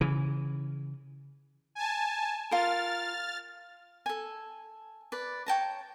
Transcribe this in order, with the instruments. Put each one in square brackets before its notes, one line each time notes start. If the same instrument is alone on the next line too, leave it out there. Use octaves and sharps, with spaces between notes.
[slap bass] C#3 E3
[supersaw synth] G#5 A5
[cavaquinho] F4 A#4 [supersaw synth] F6 A6
[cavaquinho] A4 G#5
B4 D5
C#5 G5 A5 A#5